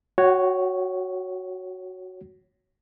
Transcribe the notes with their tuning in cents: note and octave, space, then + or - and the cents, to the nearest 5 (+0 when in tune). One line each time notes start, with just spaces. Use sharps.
F#4 +0 C#5 +0 G5 -40